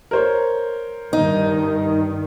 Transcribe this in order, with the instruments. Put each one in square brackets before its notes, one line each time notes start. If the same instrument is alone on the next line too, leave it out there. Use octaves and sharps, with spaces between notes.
[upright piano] A#4 C5 C#5
[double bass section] G2 D#3 [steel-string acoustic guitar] D#4